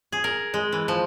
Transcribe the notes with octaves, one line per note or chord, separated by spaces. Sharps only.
G#4
A#4
G#3
E3
F3